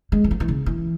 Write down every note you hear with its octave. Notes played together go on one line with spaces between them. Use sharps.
G#3
E3
F#3
E3
C#3
E3